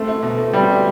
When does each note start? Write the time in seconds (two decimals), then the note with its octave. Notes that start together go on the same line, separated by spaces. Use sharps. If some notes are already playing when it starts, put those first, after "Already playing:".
Already playing: A3 C4
0.08 E4
0.23 B2
0.38 A3
0.53 G3 C4
0.69 E4